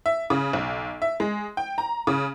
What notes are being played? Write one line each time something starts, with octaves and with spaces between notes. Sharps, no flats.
E5
C#3
B1
E5
G#3
G5
A#5
C#3